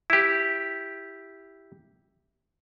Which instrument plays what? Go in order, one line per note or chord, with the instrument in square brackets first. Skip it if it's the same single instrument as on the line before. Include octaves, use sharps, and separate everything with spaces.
[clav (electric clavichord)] E4 G4